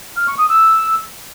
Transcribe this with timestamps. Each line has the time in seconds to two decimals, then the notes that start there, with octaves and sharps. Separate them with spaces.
0.17 F6
0.28 C#6
0.39 D#6
0.50 E6